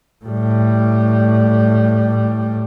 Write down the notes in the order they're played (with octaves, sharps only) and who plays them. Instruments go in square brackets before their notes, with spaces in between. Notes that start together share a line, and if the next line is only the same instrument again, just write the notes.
[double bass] A2 G3